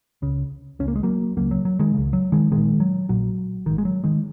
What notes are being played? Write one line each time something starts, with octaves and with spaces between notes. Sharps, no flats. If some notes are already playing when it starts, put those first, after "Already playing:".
C#2 C#3
C#2 C#3 C#4
A#3
G#3
F#3 A#3
C#2 C#3 F#3 A#3
F#3
F#3
D#3 G#3
C#2 C#3
F#3
D#3 G#3
A#1 A#2 D#3 G#3
F#3
A#1 A#2 F#3
G#1 G#2 D#3
G#3
F#3
D#3 G#3